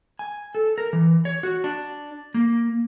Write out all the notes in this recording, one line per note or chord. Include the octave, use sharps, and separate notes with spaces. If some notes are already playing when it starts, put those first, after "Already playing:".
G#5
A4
A#4
E3
C#5
F#4
D4
A#3